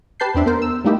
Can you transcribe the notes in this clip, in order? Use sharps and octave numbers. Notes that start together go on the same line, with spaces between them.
G4 B4 A5 G6 C7
E2 C4 D4 E5
B3 A#4 C5
E6
G3 A3 A#3 D#4 E4 G4